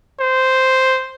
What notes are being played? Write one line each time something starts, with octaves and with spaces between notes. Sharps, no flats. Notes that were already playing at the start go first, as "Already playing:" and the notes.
C5